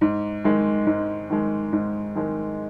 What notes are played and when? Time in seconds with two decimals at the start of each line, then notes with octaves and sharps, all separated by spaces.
0.01 G#2
0.44 D#3 G#3
0.86 G#2
1.30 D#3 G#3
1.73 G#2
2.15 D#3 G#3